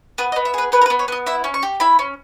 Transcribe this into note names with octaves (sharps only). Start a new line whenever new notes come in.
B3 B4
D#5
B3
E5
G#4 B4
B3 B4
A#4
B4
B3
C#5
B3 D#5
E4 E5
C#4
C#6
G4
E4 B5
C#4